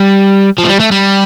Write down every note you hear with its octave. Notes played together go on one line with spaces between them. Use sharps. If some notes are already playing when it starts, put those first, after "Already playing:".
Already playing: G3
F3
A3
G3
A3
G3